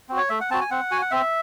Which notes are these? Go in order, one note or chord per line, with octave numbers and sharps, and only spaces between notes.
C4 F#4
C#5
A3 E5
F#5
C4 F#4 A5
G#5
C4 F#5
F#4 G#5
F#5
C4 E5